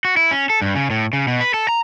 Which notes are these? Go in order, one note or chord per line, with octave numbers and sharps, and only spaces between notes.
F#4
E4
C#4
A4
G2
C#3
A2
C#3
B2
B4
A4
A#5